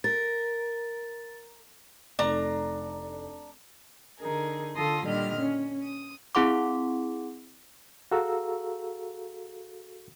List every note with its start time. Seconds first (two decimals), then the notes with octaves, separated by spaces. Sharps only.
0.04 A#4 A6
2.19 F1 D4 D#4 A4 A#5
4.19 D3 D#4 G#4 A#4
4.76 D3 F4 A4 C6 D#6 A#6
5.05 A#2 D3 D#3 G3 D#5 F6
5.39 C#4
5.83 D#6
6.35 C4 E4 G#4 F#5 C6 D6
8.11 F#4 G#4 A4 F5 A#5 E6